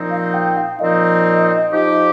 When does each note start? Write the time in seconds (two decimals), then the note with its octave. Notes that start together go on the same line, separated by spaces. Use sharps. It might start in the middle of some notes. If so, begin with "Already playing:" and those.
Already playing: A#2 F3 C4 D#4
0.11 F5
0.34 G5
0.57 F5
0.80 A#2 F3 C4 D#4 D#5
1.72 F3 D#4 G4